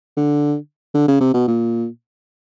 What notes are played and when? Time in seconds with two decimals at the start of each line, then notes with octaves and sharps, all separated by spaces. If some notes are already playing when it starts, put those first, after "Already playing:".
0.17 D3
0.95 D3
1.08 C#3
1.21 C3
1.34 B2
1.48 A#2